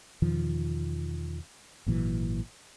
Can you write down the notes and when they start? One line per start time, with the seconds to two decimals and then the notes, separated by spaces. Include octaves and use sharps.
0.22 E2 B2 D#3 F3
1.86 G#1 A#2 E3 F#3